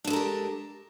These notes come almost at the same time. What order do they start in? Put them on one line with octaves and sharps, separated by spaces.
D4 G#3 A4 A#4 G4